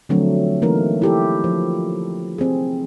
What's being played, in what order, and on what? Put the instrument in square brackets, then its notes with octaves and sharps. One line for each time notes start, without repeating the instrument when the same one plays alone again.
[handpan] D3 F3 F#3 A3 C4 D4
E3 A3 A#3 C4 D#4 A#4
E4 G4 A4
F3
C4 G#4